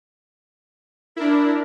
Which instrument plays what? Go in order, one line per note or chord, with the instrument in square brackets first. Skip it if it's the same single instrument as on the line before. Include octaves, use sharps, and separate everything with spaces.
[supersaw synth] D4 E4 [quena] A#4